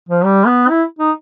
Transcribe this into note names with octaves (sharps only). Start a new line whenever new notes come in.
F3
G3
B3
E4
D#4